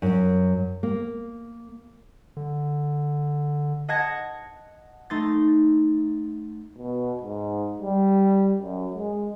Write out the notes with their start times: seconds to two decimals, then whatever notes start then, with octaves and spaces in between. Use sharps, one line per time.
0.02 F#2
0.83 A#3
2.37 D3
3.89 D#5 F#5 A5 F#6 G#6 A#6
5.10 A3 D#4 C6 A6
6.78 B2
7.22 G#2
7.82 G3
8.62 F#2
8.95 G#3